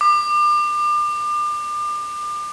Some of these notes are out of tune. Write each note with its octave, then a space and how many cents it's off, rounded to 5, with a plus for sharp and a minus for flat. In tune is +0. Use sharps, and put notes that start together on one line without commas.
D6 +35